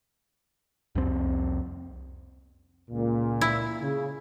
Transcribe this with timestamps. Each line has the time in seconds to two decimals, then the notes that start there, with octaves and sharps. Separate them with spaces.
0.95 C2 F2 C4
2.91 C#2 A#2
3.41 E4
3.81 C#3